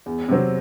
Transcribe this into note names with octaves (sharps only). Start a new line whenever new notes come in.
E2
C3 F#3 C4